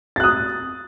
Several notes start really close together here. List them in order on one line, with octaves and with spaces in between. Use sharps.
A6 F#6 D#6